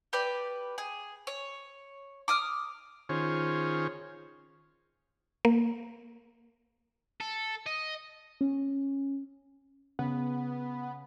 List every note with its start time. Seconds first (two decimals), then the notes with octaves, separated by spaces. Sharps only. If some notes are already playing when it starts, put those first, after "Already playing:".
0.13 G4 B4 D5
0.78 G#4
1.27 C#5
2.28 D6 D#6 F6
3.09 D#3 C#4 F4 G#4 C5 C#5
5.45 A#3
7.20 A4
7.66 D#5
8.41 C#4
9.99 C#3 B3